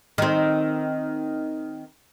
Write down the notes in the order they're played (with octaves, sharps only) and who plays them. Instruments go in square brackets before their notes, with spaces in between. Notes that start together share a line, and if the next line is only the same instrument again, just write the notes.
[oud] D#3 C4